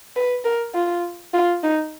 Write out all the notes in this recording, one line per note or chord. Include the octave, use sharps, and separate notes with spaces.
B4
A#4
F4
F4
D#4